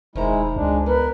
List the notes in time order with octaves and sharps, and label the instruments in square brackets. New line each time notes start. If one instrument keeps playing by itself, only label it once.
[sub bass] E1 [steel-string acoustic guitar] D#3 C5 A#5 [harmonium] G#3 E4
[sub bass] C#2 [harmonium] G#3 D4
[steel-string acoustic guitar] B3 [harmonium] A#4 [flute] B4